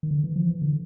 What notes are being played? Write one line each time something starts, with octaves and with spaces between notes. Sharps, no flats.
D#3
D3
E3
F3
E3
D3